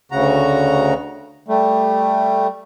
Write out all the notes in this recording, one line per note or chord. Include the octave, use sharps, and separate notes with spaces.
D2 C#3 F#4 A#5
G3 A3